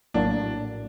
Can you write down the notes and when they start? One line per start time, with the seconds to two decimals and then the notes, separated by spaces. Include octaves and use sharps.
0.14 A#1 A2 F#3 A#3 D4